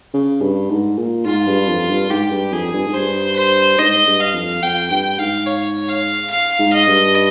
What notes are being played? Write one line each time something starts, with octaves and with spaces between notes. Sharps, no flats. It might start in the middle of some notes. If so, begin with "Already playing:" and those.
C#3
G2
G#2
A#2
G#2 F4
G2
F2
G2
G#2 G4
G2
F2 G#4
G2
G#2
G2 C5
C5
G#2 D#5
G2
F5
F2
F2 G5
G2 G5
G#2 F5
C#5
F5
F5
G#2
D#5
G2